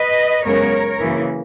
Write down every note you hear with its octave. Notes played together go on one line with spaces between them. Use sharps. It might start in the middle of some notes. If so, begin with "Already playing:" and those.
Already playing: B4 D#5
F#2 C#3 G#3 B3 A#4 C#5
F#2 C#3 E3 A#3